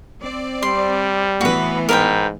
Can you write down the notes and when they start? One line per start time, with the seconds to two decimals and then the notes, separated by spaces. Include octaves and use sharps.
0.20 C4 D5
0.63 G3 C6
1.41 A2 E3 B3 F#4 B4
1.89 G#2 A#4 B4 G5